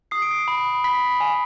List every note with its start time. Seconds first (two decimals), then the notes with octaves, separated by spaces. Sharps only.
0.11 D#6 C7
0.22 D7
0.31 C7
0.48 B5
0.84 B5 B6
1.20 G#5